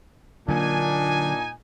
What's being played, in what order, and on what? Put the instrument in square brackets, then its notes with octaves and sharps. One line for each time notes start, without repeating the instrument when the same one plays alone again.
[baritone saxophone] A#2 [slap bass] D3 F#3 A#3 [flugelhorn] D4 [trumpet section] D#4 G#5